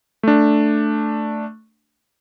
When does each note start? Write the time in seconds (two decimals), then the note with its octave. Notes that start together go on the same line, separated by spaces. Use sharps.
0.23 A3 D4